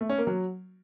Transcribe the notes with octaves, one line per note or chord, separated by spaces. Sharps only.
A3
C#4
A#3
F#3